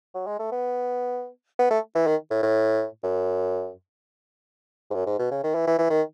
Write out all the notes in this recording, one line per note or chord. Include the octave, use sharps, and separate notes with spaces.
F#3
G#3
A3
B3
B3
A3
E3
D#3
A2
A2
F#2
G#2
F#2
G#2
B2
C#3
D#3
E3
E3
E3
D#3